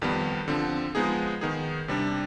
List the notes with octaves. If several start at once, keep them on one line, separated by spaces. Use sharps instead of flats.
F2 D#3 G3 B3
D3 F3 C4
F3 G#3 B3 D#4 G#4
D#3 B3 D#4 G#4
C3 G3 D4